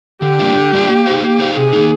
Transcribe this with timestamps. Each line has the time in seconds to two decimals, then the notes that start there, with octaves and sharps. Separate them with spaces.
0.22 D3 G4
0.39 G3 A#3 D4 F4
0.56 D3
0.73 G3 A#3 D4 F4
0.89 A#3
1.06 D#4 G#4 C5 F5
1.22 A#3 G4
1.39 D#4 G#4 C5 F5
1.56 C3 G#4
1.73 D#3 A#3 D#4